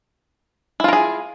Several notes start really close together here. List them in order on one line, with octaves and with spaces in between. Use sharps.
E4 F4 A#4 G#4